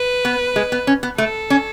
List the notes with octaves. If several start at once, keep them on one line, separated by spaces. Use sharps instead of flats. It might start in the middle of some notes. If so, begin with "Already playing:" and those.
Already playing: B4
B3
G#3
B3
C#4
B3
A3 A4
C#4